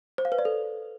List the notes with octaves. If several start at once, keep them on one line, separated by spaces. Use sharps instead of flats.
C5
F5
B4
D5
A4